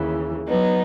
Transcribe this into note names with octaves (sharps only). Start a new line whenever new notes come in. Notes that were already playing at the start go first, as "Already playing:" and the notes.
Already playing: D#2 C#3 E3
F#3 B3 D#4